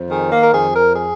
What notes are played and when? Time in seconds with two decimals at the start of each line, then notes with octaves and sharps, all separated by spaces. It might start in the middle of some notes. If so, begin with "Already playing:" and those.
Already playing: F2
0.09 D#3 G#4
0.31 A#3
0.42 A#4
0.53 F2 G#4
0.75 A#4
0.95 G#4